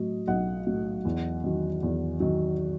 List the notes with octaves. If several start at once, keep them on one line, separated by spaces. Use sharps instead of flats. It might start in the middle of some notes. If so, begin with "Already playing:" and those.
Already playing: A2 F#3 D#5
B1 D#5 F#5
A2 F#3
E2
D#3 F#3
E2
D#3 F#3